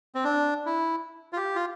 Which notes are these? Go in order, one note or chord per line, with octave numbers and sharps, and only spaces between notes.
C4
D4
E4
F4
G4
F4